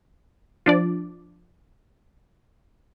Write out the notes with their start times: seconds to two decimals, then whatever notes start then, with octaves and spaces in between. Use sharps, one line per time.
0.66 F3 D4 D5